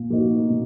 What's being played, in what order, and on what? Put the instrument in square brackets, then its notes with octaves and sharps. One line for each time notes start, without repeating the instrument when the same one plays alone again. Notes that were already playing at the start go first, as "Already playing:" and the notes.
Already playing: [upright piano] A#2
A#3 D#4 F#4
A#2